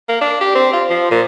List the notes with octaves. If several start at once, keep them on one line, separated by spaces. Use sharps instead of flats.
A#3
D4
G4
C4
F4
F3
A#2